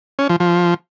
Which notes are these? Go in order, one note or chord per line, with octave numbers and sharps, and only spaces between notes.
C#4
F3
F3